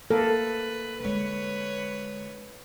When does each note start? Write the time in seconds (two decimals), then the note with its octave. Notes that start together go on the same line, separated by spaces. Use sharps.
0.10 A#3 A4 B4
1.00 D3 G#3 B4 C#5